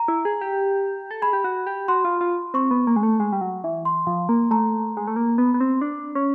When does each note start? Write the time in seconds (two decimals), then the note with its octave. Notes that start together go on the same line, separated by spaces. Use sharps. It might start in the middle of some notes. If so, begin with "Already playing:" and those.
Already playing: A#5
0.08 E4
0.25 G#4
0.41 G4
1.11 A4
1.22 G#4 B5
1.33 G4
1.44 F#4
1.67 G4
1.88 F#4 C6
2.05 F4
2.21 F4
2.54 C4 C#6
2.71 B3
2.87 A#3
2.96 G#3
3.03 A3
3.20 G#3
3.33 G3
3.41 F#3
3.64 E3
3.85 C6
4.07 F3
4.29 A#3
4.51 A3 A#5
4.97 G#3
5.07 A3
5.16 A#3
5.38 B3
5.54 B3
5.60 C4
5.81 D4
6.15 C#4